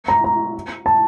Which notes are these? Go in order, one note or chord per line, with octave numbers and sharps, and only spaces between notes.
A#5
A#5
A5